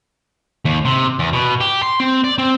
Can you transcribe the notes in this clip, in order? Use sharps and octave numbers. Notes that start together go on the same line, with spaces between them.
D#2
C3
E2
B2
G4
C6
C4
D5
C4